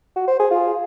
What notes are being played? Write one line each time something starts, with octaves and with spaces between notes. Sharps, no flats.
F#4
C5
G#4
F4